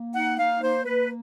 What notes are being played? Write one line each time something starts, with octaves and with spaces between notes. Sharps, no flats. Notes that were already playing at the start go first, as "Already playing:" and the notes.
Already playing: A#3
D#4 F#5
A#3 F5
A#3 C5
A#3 B4